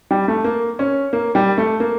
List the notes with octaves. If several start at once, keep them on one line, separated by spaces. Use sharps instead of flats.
G3
A3
A#3
C#4
A#3
G3
A3
A#3